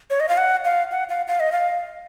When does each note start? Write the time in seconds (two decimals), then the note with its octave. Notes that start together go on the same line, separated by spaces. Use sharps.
0.10 C#5
0.20 D#5
0.29 F5
0.37 F#5
0.65 F5
0.91 F#5
1.09 F5
1.28 F5
1.40 D#5
1.52 F5